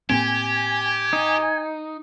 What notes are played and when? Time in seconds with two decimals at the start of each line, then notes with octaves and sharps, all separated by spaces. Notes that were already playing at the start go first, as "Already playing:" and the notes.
0.10 A2 A#3 C4 G4 G#5
1.13 D#4